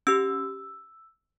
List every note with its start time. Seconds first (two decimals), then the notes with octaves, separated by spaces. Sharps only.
0.07 C#4 G4 E6